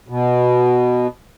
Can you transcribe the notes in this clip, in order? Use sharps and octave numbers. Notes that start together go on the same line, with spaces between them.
B2